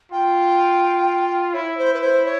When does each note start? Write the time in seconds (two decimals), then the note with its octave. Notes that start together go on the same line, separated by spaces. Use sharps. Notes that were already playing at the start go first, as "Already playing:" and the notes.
0.12 F4 G5
1.53 E4 C#5
1.77 C5
1.94 B4
2.01 C5
2.25 C#5